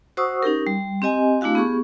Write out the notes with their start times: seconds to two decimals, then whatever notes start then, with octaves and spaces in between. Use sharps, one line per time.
0.17 F#4 C5 F#5 C#6 D#6 E6
0.43 C#4 D#4 G4 A#4
0.67 G3
1.02 C4 G4 D#5 G#5
1.41 A3 D4 E4 F#4 F5
1.55 B3 G4 G#4 C#6